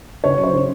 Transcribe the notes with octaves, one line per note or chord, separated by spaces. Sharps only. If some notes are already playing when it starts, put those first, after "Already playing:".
C#3 C#5
F#3
C5
C#3